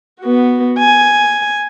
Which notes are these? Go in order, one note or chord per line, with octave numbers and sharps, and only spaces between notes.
B3 F#4
G#5